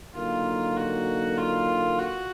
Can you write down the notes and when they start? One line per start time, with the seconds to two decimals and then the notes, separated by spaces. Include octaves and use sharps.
0.15 D3 F#3 A#3 D#4 F4
0.77 F#4
1.38 F4
1.99 F#4